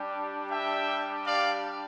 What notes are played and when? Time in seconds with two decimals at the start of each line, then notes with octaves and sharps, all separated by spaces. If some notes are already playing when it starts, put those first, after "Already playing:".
Already playing: G3 D4 G4
0.50 E5 G5
1.25 D5 F5